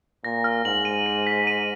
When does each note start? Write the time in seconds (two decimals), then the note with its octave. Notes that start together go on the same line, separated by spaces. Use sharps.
0.24 A#2 A#6
0.44 F6
0.65 G#2 F#7
0.85 D#7
1.06 D#7
1.27 B6
1.47 D#7